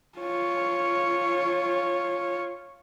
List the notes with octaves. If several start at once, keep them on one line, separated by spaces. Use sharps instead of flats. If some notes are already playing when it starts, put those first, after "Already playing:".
F4 C#5